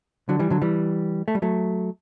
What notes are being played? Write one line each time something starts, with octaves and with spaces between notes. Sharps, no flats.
D3 F#3
E3 G3
D3 F#3
E3 G3
A3
G3
F#3 A3